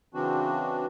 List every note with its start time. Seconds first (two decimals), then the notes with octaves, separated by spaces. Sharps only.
0.14 C#3 E3 C4 D4 F#4